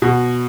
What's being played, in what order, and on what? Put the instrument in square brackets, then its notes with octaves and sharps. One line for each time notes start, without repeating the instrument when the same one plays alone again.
[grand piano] B2